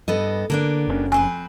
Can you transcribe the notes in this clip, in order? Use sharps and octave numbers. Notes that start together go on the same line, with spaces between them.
G2 B3 A4 D#5
D3 A#3 B3 D4
F#1 B2 C#4
F2 C4 B4 G#5